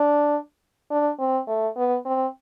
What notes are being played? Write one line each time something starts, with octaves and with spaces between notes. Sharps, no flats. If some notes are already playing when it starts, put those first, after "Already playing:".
Already playing: D4
D4
C4
A3
B3
C4